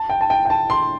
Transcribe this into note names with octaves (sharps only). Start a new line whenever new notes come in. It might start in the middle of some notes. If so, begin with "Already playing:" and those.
Already playing: A5
G5
A5
G5
G5
A5
C6